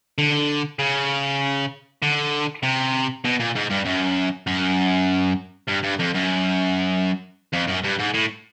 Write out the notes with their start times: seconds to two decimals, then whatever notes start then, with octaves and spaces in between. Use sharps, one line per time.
0.18 D3
0.79 C#3
2.02 D3
2.63 C3
3.24 B2
3.39 A#2
3.55 G#2
3.70 G2
3.85 F#2
4.47 F#2
5.68 G2
5.84 G2
6.00 F2
6.15 F#2
7.53 F2
7.67 F#2
7.84 G2
7.99 G#2
8.14 A2